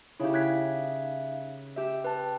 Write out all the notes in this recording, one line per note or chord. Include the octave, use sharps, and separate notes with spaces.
C#3 D#4 E4 G4 E5 F5
F#6 G#6 B6
G4 E5
B4 G5 A5